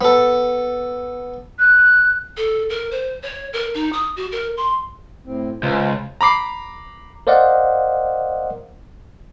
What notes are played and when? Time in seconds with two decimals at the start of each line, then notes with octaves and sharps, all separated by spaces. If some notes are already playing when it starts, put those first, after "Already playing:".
0.01 B3 A4
1.59 F#6
2.37 A4
2.69 A#4
2.91 C5
3.22 C#5
3.53 A#4
3.74 D#4
3.93 D#6
4.16 F#4
4.32 A#4
4.57 C6
5.26 A2 C4
5.63 C#2 C#4 F4 C5
6.21 A#5 B5 D6 C7
7.27 A#4 C5 D5 D#5 F5 F#5